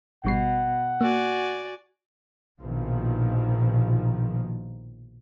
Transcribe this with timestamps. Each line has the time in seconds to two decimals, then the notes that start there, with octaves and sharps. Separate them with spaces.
0.25 G#1 B2 G3 F#5 C7
1.01 A#3 F#4 D5 G#5
2.62 A#1 B2 D#3 F3